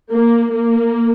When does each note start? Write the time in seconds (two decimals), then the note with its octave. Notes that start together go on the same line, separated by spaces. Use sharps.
0.11 A#3
0.52 A#3